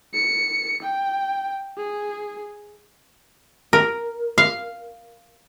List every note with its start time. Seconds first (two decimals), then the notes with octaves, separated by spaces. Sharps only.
0.14 C#7
0.83 G5
1.78 G#4
3.73 A#4
4.38 F5